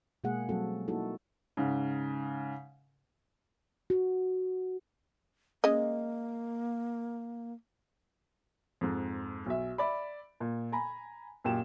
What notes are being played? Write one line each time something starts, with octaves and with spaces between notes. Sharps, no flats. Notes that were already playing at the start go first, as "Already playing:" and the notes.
B2 G#3 A#3 G#4 F#5
F#3 G3 A3 C4 F#4 A4
A#3 D#4 E4 F#4 A4
G#2 C#3
F#4
G#3 A#3 C#4 D#5
F2 G#2
B1 E5
D5 E5 B5
A#2
G#5 A#5 B5
F#2 A#2 G4 E7